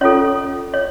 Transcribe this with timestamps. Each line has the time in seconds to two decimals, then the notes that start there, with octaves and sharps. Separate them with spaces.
0.01 C#4 F4 A4 C#5
0.74 C#5